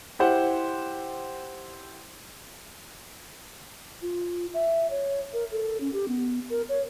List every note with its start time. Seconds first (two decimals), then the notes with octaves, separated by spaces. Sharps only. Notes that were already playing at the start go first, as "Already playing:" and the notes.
0.19 E4 G4 C5 F#5
4.02 F4
4.54 E5
4.90 C#5
5.33 A#4
5.52 A4
5.81 C#4
5.93 G4
6.08 B3
6.50 A#4
6.69 C#5